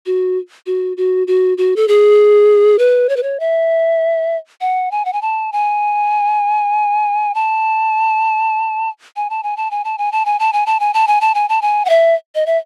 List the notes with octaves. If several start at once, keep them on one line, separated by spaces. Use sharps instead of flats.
F#4
F#4
F#4
F#4
F#4
A4
G#4
B4
C#5
B4
C#5
E5
F#5
G#5
F#5
G#5
A5
G#5
A5
G#5
A5
G#5
A5
G#5
A5
G#5
A5
G#5
A5
G#5
A5
G#5
A5
G#5
A5
G#5
A5
G#5
F#5
E5
D#5
E5